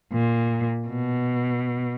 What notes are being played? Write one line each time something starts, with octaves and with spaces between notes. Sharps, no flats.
A#2
B2